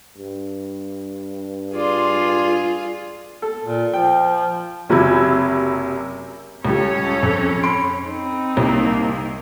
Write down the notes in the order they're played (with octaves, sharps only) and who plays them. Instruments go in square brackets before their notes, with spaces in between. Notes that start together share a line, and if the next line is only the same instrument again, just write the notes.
[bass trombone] G2
[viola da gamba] F4 G#4 [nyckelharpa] D5 C6
[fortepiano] A4
[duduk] A#2
[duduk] F3 [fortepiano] G5
[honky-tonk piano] F#1 C3 F#3 B5 E6 G#6
[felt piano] C#2 G3 [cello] C#4 [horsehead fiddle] A4 C#5
[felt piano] F2
B5 C6 D7
[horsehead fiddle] C4 D#4
[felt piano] C2 [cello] A#3